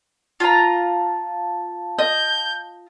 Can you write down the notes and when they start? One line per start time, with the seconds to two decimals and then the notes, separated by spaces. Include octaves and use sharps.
0.40 F4 A5 A#5
1.99 D#5 G6